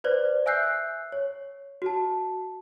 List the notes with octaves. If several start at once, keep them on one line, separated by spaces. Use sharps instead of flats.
B4 C5 D5
E5 G#5 E6 F#6 G6 C7
C#5
F#4 A5